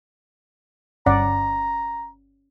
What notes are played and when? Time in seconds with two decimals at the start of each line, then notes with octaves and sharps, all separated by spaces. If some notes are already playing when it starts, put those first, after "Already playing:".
1.06 G1 C#4 D5 F#5 A#5